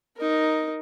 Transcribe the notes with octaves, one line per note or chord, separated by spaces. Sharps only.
D#4 A#4